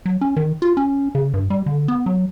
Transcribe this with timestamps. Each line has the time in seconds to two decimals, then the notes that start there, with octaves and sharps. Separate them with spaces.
0.06 F#3
0.21 C#4
0.36 D#3
0.62 F4
0.77 C#4
1.15 C#3
1.34 G2
1.50 G3
1.66 D3
1.88 B3
2.06 F#3